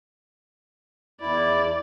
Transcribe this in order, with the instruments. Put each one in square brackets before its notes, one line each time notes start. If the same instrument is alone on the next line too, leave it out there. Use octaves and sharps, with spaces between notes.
[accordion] E2 E4 [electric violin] D5